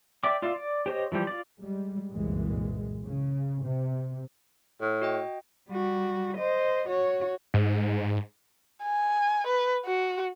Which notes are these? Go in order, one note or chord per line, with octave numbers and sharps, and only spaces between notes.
D5 E5 G5 D6
F4 D5 E5 F5
D5
G4 C5 C#5 D#5
E3 F3 G3 G5
F4 D5
G3 G#3
G1 C2 F#2 A#2 E3 G#3
C#3
C3
A2
F#4 D#5 G5
G3 F#4
C5 D#5
F#4 C#5
G#2
G#5
B4
F#4